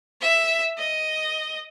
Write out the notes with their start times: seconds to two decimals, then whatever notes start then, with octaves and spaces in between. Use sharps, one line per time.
0.21 E5
0.78 D#5